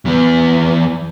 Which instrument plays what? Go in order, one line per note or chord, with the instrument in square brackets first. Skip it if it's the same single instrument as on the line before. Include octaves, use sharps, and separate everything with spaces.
[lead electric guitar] E2 E3